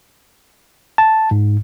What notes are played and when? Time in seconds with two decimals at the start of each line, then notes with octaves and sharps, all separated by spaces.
0.98 A5
1.31 G#2